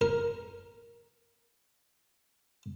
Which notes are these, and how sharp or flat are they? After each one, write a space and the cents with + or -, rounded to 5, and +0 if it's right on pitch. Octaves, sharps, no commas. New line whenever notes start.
A#4 +5